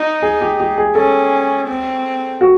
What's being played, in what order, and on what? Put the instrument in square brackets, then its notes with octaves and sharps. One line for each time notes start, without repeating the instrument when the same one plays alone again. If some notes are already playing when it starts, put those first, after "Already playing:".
Already playing: [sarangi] D#4
[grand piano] G#4
G4
G4
G#4
[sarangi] C#4 [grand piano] A4
[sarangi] C4
[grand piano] F#4